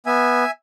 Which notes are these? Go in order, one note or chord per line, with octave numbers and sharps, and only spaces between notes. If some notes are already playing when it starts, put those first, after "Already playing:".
B3 E5 G#5